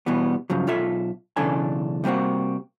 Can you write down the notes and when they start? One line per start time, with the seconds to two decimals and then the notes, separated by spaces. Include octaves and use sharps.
0.06 B2 E3 G3 B3
0.50 G2 C#3 F3 F#3
0.67 B1 F4 A4 E5
1.36 B1 C#3 E3 D4 A4 G#5
2.04 C3 G3 A#3 C4 F#4